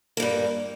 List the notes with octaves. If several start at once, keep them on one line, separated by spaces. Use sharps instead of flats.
G2 G3 A#3